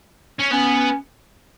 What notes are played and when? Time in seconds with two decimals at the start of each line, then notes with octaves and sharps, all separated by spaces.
0.40 C#4
0.52 B3 C#4